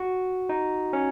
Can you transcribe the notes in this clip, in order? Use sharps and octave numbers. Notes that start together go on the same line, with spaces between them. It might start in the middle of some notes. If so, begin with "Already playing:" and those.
Already playing: F#4
D#4
C#4